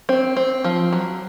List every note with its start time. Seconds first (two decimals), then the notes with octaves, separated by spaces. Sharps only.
0.09 C4
0.37 C4
0.64 F3
0.93 F#3